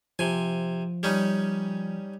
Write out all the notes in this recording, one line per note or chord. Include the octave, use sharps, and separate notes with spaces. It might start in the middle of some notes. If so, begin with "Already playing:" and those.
C3 F3 G#5
G3 C#4 D#4